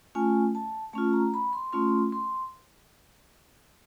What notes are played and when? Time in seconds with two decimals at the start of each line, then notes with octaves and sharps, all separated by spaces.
0.15 A3 C#4 F4 G#5
0.55 A5
0.93 A3 C#4 F4 A5
1.13 A#5
1.34 B5
1.53 C6
1.73 A3 C#4 F4 C6
2.12 C6